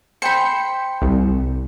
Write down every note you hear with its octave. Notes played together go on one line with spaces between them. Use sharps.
C5 G5 B5 C#7
C2